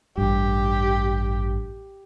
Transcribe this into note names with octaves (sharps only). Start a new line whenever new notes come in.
A1 G2 G4